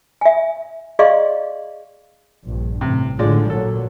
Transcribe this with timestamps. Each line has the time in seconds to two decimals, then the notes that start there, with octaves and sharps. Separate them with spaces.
0.21 E5 G#5
0.99 G#4 D5 D#5 F5 C6 C#6
2.45 A#1 G2
2.81 A1 C3
3.19 A2 D3 F3 G#3 D5
3.50 A#2 F#3 A4